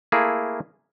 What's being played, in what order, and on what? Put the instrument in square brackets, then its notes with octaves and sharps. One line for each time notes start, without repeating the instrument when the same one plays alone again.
[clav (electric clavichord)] A3 A#3 E4 G#4